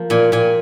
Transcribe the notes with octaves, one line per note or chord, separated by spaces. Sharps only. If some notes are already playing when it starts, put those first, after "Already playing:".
Already playing: F3 A#3
A#2 G#5
A#2 G#5